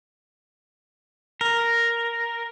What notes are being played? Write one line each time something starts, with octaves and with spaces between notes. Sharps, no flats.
A#4